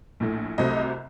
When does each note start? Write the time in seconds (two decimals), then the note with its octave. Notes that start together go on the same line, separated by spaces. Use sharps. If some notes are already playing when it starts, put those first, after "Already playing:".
0.20 A#1 A2 A3
0.58 C2 C3 F#3 A3 C4 D#5